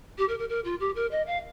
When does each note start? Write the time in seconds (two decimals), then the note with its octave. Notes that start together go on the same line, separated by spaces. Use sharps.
0.18 G4
0.29 A#4
0.39 A#4
0.49 A#4
0.65 F4
0.80 G4
0.95 A#4
1.11 D#5
1.27 F5